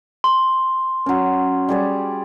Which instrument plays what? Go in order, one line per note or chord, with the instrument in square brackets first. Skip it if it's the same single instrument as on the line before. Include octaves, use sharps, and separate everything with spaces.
[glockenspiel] C6
[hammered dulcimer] F#3 C#4
G3 G#4 D5